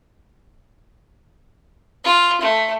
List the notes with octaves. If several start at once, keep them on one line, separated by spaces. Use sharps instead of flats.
F4
A3